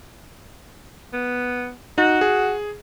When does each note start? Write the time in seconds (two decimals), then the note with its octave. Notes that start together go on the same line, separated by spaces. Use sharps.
1.13 B3
1.98 D#4 F#4
2.21 G#4